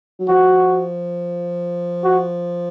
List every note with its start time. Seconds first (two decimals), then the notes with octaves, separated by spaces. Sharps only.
0.19 F#3
0.28 F3 F#4
2.04 F#4